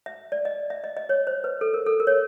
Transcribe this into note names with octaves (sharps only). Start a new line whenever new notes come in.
E5
D5
D#5
E5
D#5
D#5
C#5
C5
B4
A4
A#4
A4
A#4
C#5